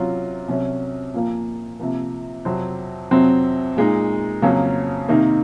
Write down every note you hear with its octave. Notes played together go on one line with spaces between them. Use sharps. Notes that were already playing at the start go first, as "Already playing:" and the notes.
Already playing: C3 F#3 C#4 F4
C2 C3 F#3 C#4
A#2 F3 A#3
C3 F3 A#3
F2 C3 F#3 C4
F2 C3 F#3 C4
A#2 G#3 D#4
F2 C#3 F#3 A#3 C#4
C3 D#3 A#3 D#4